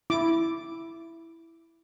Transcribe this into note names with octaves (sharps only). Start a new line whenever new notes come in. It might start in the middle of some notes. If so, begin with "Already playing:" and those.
E4 D6